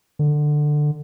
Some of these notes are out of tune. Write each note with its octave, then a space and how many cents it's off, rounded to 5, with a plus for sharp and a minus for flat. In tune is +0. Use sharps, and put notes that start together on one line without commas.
D3 +15